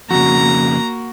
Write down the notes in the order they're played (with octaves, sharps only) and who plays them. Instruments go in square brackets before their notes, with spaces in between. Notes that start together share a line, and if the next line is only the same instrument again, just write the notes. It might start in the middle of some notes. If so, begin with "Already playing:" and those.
[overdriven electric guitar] F2 C#3 [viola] A#3 [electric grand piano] F#4 [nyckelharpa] A#5